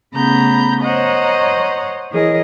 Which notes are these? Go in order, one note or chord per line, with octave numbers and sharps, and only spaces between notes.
C#3 A3 B3 A#5 B5 G6
C5 C#5 D#5 F#5 A#5
E3 G#4 A#4 C#5 D#5